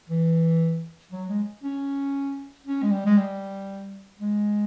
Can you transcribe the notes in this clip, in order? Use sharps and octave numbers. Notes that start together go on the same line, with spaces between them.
E3
F#3
G#3
C#4
C#4
G#3
G3
G#3
G3
G#3